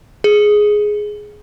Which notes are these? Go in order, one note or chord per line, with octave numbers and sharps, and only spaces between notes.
G#4